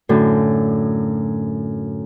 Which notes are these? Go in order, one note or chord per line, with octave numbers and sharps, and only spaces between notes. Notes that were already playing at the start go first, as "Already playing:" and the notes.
F#2 A2 D3